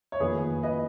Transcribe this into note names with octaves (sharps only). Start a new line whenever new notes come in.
C#5
F2 D#3 A#3 F4 G#4 B4
B4 D#5